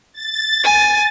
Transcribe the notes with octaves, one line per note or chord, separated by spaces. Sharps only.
A6
G#5